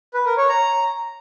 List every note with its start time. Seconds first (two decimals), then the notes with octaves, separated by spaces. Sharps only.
0.14 B4
0.26 A#4
0.37 C#5
0.49 A#5